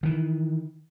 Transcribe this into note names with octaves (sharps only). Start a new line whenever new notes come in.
D#3 E3